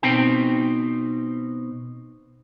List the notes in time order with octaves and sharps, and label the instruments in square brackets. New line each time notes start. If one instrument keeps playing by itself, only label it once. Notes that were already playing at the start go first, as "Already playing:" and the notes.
[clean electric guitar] B2 C4 D#4 G5